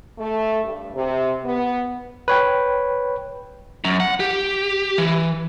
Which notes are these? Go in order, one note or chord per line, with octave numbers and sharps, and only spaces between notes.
A3
G2
C3
B3
B4 C#5 G5
F#2
F#5
G4
E3